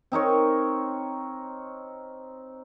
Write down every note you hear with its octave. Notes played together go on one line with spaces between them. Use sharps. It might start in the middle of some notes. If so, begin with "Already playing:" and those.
C4 D#4 A#4 C#5